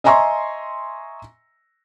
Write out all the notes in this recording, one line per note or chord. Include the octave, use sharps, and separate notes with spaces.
D#5 E5 G#5 A#5 C6 C#6